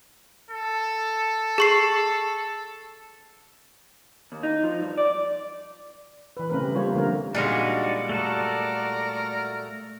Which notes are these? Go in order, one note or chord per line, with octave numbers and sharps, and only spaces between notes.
A4
G#4 C#6 C7
D#2
D#4
F3
G2
D5
E3 B4
C#3 A3 C4 C#4 A#4 B4
G3 G4
G3 A#3 F4 C5 C#5
D3 F3 A3 A#3 A#4
A#2 G3 G#3 D4 D#4 F#4 D5
A3 F#4 A4 A#4